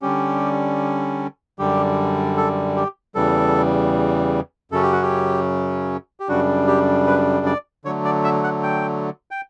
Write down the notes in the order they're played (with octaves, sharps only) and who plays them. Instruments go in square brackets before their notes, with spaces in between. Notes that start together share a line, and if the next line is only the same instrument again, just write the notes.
[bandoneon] D3 G3 C#4 G4
F#2 D3 G3 G4
A4
G4
E2 C#3 E3 G3 A4
F#2 C#3 F#3 C#4 A4
G4
F#4
G4
G4
F#2 C#3 G3 D4 F#4
G4
B4
D5
D3 F#3 A3 C#5
D5
E5
F#5
G5
G5